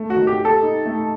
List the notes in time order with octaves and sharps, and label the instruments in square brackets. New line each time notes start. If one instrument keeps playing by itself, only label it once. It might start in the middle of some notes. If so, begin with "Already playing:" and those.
Already playing: [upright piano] A3
[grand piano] F#4
[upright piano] D#3
[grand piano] G4
[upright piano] G4
[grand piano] A4
[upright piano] D#4
A3